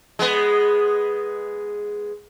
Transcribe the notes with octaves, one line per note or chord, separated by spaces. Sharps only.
G#3 B3